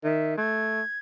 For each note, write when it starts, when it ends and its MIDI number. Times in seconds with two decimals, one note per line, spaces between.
0.04 0.37 51
0.04 0.34 76
0.37 0.82 57
0.37 0.99 92